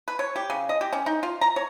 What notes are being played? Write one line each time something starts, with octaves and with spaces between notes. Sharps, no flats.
B4
C#5
G4
C#3
D#5
G4
C#4
D#4
F4
A#5
C#5